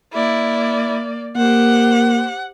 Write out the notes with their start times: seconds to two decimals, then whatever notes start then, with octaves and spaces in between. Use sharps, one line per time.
0.14 A#3 E4 D5
1.37 A#3 G4 C5 F#5